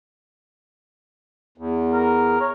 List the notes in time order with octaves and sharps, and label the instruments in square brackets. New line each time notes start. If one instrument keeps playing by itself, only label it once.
[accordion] E2
[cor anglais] A#4
C#5